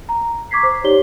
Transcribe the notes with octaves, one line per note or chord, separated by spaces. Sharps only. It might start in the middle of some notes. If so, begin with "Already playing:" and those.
A#5
C#6 D6 G#6 B6 C7
C5
D#4 G4 C#5 D5 G7